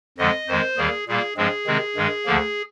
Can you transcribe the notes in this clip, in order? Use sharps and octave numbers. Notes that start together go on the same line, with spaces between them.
F2 D3 F3 G#3 D#5
F2 D#3 G#3 C5
D#2 D#3 G3 A#3 G#4
A#2 G3 A#3 G#4
G2 F3 G#3 C4 G#4
C3 D#3 G#3 C4
G2 D#3 G#3
D2 D3 F3 A#3